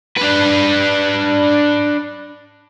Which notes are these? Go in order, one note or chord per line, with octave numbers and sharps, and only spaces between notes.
D4 B4